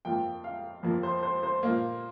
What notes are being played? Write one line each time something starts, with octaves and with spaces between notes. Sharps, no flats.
F2 F3 A#3 G5
F5
F2 F3 A#3
C5
C5
C5
A#2 F3 A#3